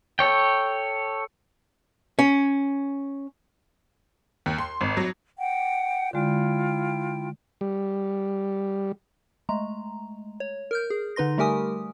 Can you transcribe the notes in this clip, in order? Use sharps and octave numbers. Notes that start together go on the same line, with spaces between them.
A4 C#5 G5
C#4
D#2
C6
G#1
F#3
F#5 G5
D3 G#3 E4 F4 G5
G3
G#3 A3 A#5
C#5
A#4 F6 G6
G#4
D3 D#4 B4 C6 A#6
G3 A3 G4 A#4 G#5 D#6